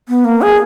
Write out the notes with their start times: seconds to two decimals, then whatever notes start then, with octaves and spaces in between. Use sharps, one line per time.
0.08 B3
0.24 A#3
0.42 G#4